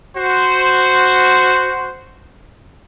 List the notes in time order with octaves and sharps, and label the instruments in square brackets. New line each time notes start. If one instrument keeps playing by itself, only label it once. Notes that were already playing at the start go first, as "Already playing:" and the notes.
[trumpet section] F#4 C5